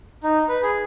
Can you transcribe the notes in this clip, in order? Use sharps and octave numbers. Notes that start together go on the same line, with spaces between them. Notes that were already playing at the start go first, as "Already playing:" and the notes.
D#4
B4
G#4